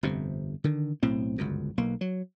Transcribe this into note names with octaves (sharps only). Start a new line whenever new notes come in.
G1 F2 C3
D3 D#3
B1 A2 C4
G1 C#2 F#2
B1 A#3
F#3